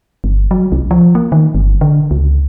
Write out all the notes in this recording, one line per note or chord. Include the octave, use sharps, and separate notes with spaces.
G1
F#3
C2
F3
A#3
D#3
G1
D3
C#2